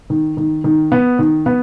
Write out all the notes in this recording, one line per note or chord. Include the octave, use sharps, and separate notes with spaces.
D#3
D#3
D#3
B3
D#3
B3